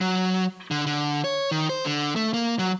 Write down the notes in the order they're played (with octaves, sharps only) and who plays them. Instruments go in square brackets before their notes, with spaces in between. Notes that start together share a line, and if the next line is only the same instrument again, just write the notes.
[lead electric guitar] F#3
D3
D3
C#5
D#3
C5
D3
A3
A#3
F#3